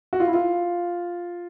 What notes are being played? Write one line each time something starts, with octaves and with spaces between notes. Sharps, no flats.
F#4
F4
E4
F4